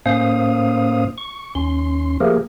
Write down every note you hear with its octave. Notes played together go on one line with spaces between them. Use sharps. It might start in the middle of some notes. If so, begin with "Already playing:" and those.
A2 A#3 C#4 C5 F5 D#6
C#6
D#2 C#4 C6
F3 A3 A#3 G4 G#4 A#4